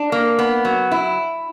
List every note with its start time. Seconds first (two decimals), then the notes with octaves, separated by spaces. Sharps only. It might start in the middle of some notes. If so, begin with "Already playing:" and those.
Already playing: D4
0.12 A#3
0.39 B3
0.65 F#3
0.91 E4